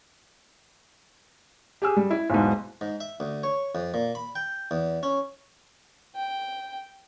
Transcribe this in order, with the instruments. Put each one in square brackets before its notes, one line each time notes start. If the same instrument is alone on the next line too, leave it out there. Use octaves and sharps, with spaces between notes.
[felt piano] G4 G#4 E6
G3
E4
B1 E2 G#2
[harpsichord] G#2
E5
D2
C#5
F2
A#2
B5
G5
E2
C#4
[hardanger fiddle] G5